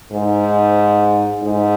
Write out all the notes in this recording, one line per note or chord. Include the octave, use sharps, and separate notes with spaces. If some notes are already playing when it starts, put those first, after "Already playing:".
G#2
G#2